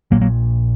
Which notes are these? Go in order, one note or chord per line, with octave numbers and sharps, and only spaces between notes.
A#1 A#2 F#3 A#3
F#3 A#3